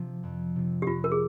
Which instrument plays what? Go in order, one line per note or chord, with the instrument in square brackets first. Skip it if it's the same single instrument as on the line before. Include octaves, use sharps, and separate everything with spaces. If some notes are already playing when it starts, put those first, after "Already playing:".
Already playing: [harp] C3 F3
F2
C3 F3
[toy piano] G4
[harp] F2 [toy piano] F4
[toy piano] A#4
G#4